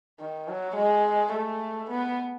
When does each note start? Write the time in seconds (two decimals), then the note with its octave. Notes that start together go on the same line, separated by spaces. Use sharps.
0.19 D#3
0.48 F#3
0.76 G#3
1.33 A3
1.90 B3